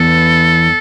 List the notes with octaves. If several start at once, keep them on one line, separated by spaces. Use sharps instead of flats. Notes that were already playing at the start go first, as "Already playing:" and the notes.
Already playing: E2 E3 A4